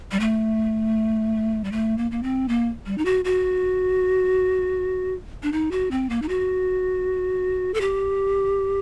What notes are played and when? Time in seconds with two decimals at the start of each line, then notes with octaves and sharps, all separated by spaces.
0.12 G3
0.20 A3
1.64 G3
1.72 A3
1.98 A#3
2.11 A#3
2.23 C4
2.48 A#3
2.86 G3
2.98 D#4
3.05 F#4
3.25 F#4
5.43 D4
5.52 D#4
5.71 F#4
5.91 C4
6.10 A#3
6.22 D#4
6.29 F#4
7.74 A4
7.81 G4